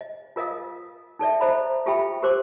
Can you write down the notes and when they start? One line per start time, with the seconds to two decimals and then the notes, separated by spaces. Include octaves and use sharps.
0.01 D#5
0.36 F4 A#4 D#5 F5 D#6
1.19 D#4 A4 D5 E5
1.41 A4 C5 D#5 E5 A#5 B5
1.86 F4 G4 A4 E5 G5 B5
2.23 G4 A#4 C5 C6 D6